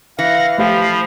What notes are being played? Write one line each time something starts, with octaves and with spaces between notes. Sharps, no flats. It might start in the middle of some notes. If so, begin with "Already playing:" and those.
E3 F5 F#5 A#6
F3 A3 G4 F5 B5